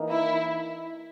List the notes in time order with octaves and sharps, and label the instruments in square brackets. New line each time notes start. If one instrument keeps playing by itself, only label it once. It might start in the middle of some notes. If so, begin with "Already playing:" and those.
Already playing: [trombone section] E3 A#3 D#4 A#4
[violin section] E4